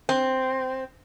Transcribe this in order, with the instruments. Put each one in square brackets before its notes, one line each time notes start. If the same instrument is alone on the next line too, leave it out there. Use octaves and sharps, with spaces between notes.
[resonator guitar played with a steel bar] C4